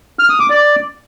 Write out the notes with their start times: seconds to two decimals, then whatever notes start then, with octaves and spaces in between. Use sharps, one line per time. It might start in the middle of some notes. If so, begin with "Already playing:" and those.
0.19 F6
0.29 D#6
0.40 D6
0.50 D5